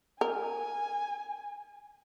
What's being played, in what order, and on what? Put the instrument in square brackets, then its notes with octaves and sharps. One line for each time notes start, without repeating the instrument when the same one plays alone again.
[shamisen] A#4 [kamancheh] G#5